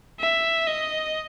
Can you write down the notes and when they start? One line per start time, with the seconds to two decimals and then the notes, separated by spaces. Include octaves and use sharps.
0.20 E5
0.67 D#5